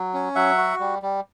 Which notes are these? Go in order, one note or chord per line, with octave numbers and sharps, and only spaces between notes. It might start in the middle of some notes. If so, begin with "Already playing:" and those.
Already playing: F#3
C#4
F#3 E5 F#5
F#4
G3
G3